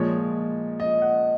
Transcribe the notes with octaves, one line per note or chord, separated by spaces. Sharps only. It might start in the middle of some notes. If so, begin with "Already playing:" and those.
Already playing: A#2 F3 G#3 C#5
D#5
F#5